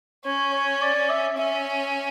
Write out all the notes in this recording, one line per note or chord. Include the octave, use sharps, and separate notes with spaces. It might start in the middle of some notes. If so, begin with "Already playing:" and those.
C#4 C#5
C#5
D5
E5
C#4 E5